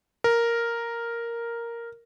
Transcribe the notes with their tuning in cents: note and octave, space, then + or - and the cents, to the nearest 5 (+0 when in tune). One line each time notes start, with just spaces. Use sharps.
A#4 +0